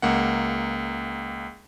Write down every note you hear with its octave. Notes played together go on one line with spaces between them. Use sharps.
C#2 A#3 F#5